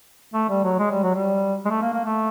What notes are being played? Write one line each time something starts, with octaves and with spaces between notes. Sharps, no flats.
A3
G3
F#3
G#3
G3
F#3
G3
G#3
A3
A#3
A#3
A3